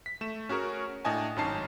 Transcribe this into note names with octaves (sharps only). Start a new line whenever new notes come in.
B6
A3 E7
C#4 F#4 G#4 A#4
A2 D4 D#5 G#5 A5
G#1 F#2 C#4 D#4 A5 C7